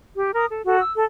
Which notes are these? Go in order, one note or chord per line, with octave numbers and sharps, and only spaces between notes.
G4
A#4 D#6
A4
F#4 A4
E6
A4